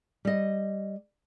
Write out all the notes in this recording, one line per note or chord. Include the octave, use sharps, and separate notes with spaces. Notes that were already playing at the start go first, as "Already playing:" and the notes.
G3 D#5